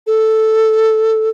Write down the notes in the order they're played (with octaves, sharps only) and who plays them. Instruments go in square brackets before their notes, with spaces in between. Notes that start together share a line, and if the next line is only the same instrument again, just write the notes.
[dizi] A4